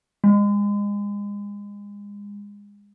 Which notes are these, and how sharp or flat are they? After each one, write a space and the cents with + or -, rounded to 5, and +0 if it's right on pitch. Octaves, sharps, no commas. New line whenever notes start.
G#3 -30